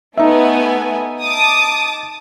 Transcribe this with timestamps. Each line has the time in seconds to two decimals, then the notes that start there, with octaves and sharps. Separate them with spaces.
0.17 A3 B3 D#4 E5 G#5
1.22 A5 D6 D#6